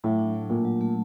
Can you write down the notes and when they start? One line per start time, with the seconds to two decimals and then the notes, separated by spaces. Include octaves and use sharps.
0.04 A2 F#3
0.19 D4
0.34 A3
0.50 A#2 A3
0.65 F#3
0.81 A3